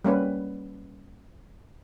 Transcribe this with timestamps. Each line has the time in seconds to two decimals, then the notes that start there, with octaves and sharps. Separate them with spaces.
0.04 G3 A#3 C#4 B4